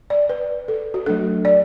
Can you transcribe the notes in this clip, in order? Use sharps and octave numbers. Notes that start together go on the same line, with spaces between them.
D5
B4
A4
F#4
F#3 A3 D4 A4
D5